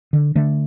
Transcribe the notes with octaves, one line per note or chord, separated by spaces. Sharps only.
D3
D3 A3